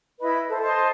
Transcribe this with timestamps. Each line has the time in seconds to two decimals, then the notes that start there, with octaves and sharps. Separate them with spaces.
0.20 E4 B4 D#5 B5
0.49 A4 C5
0.62 C5 D#5 A5 C6